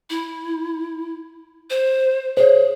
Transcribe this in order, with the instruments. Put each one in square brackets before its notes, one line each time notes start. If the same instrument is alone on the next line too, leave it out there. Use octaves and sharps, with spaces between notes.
[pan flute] E4
C5
[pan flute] G#4 [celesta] C5 C#5